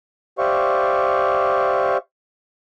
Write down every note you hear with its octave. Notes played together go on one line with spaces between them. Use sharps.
G4 C5 D5 E5 F5 C#6